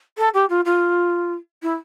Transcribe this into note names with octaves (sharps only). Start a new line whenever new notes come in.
A4
G4
F4
F4
E4